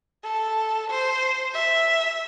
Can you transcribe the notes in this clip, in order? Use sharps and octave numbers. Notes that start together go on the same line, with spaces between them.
A4
C5
E5